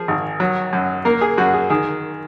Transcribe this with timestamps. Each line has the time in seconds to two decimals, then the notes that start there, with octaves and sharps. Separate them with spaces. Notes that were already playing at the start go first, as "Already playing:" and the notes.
Already playing: F3 G#4
0.08 G#1
0.40 F#3
0.73 F#2
1.05 A#3 A#4
1.21 G#4
1.38 F#2 F#4
1.54 G#4
1.70 D#3 G#4